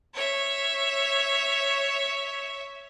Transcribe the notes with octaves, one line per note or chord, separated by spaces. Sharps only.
C#5 E5